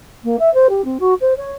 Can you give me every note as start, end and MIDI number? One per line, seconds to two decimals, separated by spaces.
0.24 0.36 58
0.39 0.52 76
0.54 0.67 72
0.69 0.84 67
0.84 0.97 60
1.00 1.14 66
1.21 1.33 72
1.37 1.54 73